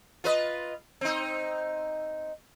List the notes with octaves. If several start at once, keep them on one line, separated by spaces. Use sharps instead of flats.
F4 B4 D#5
C4 D#4